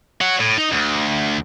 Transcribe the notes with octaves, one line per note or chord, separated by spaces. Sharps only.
C#5 F#5
A2
D#4
D2